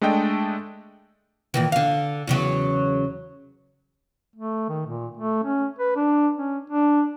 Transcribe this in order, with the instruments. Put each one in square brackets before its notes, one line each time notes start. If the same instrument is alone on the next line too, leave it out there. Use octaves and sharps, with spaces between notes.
[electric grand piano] G#3 A3 D4 A4 D#5 G5
[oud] A#2 D#3 E3
D3 F5
E2 C#3 F#3
[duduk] A3
D#3
A#2
A3
C#4
B4
D4
C#4
D4